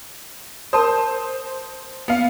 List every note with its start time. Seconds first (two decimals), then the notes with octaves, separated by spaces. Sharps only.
0.73 A#4 C5 A5 C6 D#6
2.08 B3 F5